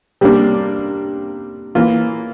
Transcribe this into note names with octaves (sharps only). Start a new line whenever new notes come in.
C3 G3 A#3 D4
E3 A#3 F4